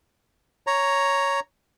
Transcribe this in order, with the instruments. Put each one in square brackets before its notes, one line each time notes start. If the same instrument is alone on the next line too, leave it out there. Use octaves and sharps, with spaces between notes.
[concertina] C#5 A#5